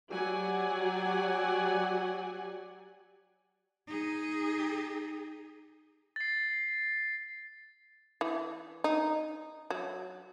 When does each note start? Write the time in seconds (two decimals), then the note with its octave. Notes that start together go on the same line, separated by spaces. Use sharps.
0.10 F#3 F#4 G4 D5 F#5 G#5
3.87 D#4 G#4
6.16 A6 C7
8.21 E3
8.84 D#4
9.70 F#3